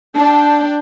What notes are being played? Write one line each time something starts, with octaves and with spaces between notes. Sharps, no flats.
D4 G5 A5